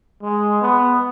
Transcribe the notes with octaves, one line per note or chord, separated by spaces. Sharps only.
G#3
B3